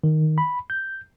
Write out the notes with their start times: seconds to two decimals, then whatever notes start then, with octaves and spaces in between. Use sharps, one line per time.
0.04 D#3
0.38 B5
0.70 G6